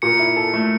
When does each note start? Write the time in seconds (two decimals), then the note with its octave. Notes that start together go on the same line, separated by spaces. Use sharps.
0.02 A#2 C#7
0.19 E4
0.37 A4
0.54 A3